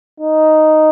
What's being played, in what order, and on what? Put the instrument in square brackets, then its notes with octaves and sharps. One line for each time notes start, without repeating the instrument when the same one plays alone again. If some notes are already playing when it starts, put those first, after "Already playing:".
[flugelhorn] D#4